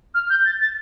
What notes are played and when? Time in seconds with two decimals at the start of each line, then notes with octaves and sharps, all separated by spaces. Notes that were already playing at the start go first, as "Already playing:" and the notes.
0.14 F6
0.30 G6
0.46 A6
0.60 A6